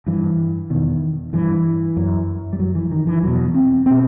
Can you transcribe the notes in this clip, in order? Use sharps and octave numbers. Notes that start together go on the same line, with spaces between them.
G2 E3
E2 B2 D#3
G2 E3
F#2
G3
F#2 F#3
E3
D#3
E3
E2 B2 F#3
C4
B2 C4